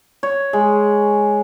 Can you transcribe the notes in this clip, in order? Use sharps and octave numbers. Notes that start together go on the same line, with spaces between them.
C#5
G#3